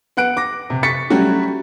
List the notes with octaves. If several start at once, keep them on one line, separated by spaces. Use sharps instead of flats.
B3 F#5 F#6 D7
D6 A#6
C3
C#6 A6 B6 C#7
F#3 G3 A3 C#4 F#4 G4